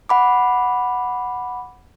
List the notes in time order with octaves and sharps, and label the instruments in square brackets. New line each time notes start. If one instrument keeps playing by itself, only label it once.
[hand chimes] F#5 B5 D6